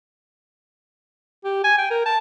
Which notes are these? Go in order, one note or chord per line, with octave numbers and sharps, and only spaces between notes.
G4
G#5
G5
A#4
A5